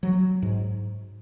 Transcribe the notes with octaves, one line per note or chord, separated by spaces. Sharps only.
F#3
G#2